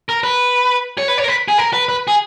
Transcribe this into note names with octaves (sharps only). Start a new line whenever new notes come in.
A#4
B4
C#5
B4
C#5
A#4
B4
G#4
A#4
B4
B4
G#4